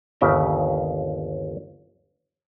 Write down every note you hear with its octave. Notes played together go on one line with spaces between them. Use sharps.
G1 D#2 C#3 E5 G5 A#5